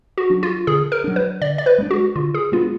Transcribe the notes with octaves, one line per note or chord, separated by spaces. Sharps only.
F#4
F#3 D4
F4
D3 G#4
A#4
F#3 D4
B4
D3 D5
D5
B4
G#3 B3 D4
F#4
D3 F4
G#4
G#3 B3 D4 F4